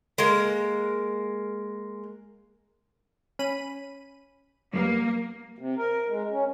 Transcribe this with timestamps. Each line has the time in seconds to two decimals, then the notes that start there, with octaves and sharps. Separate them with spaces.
0.18 G#3 A#3
3.39 C#4 B5 D#7
4.73 F#2 G3 A#3 B3
5.58 C3
5.77 A#4
6.08 G#3
6.31 C#4